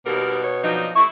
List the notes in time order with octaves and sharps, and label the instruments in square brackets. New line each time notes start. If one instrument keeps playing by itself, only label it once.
[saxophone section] D#2 G3 A#3 [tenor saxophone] B2 [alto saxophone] A#4
[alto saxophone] C#5
[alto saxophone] F3 [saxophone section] F#3 D4 D#4
[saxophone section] A2 C3 E4 [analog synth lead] C#6